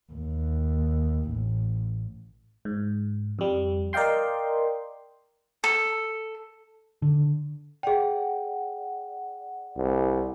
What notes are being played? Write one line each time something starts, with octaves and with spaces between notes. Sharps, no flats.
D#2
A1
G#2
F2 G3
A#4 D5 D#5 F5 G5 C6
A4
D3
G#4 D5 F#5 G5
C2